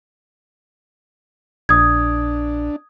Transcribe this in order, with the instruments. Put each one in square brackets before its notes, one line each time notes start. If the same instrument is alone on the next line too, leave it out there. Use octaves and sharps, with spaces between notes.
[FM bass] A#1 [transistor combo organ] D4 [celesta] D#6 G#6